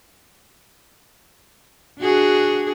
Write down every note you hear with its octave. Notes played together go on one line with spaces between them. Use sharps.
D4 F#4 G#4